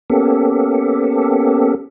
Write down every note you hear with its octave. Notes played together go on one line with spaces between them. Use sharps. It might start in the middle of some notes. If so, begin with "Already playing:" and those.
A#3 B3 C#4 G4 A4